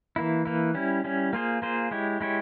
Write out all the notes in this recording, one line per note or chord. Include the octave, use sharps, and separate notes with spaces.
E3 A#3 E4
E3 A#3 E4
G3 C#4 E4
G3 C#4 E4
A#3 F4 G#4 C5
A#3 F4 G#4 C5
G#3 E4 G4 C#5
G#3 E4 G4 C#5